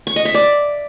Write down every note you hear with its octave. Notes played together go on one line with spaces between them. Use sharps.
C#6
D#5
E5
D5